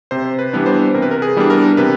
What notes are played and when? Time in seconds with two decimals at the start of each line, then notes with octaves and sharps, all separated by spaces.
0.11 C3 C5
0.39 B4
0.53 E3 G3 B3 D4
0.66 C5
0.94 C3 A#4
1.02 B4
1.11 A#4
1.22 G#4
1.36 E3 G3 B3 D4
1.50 A#4
1.77 C3 B4